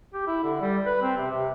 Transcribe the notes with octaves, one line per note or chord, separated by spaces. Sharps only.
G4
E4
D3
G3
B4
C4
C3
C3